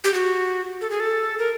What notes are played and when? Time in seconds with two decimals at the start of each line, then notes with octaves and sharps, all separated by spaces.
0.04 G4
0.14 F#4
0.81 A4
0.90 G#4
1.00 A4
1.39 A#4